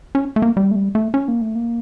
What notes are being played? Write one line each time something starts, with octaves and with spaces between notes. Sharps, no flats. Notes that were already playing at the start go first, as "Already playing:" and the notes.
C#4
A3
A#3
G3
A3
G3
A3
C#4
A#3
A3
A#3